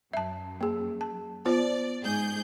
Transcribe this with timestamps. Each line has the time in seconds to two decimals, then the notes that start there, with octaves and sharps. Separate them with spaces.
0.13 F#2 E5 A5
0.61 A#3 G#4
1.01 A5
1.45 B3 F4 C5 D5
2.02 G#2 G#4 G6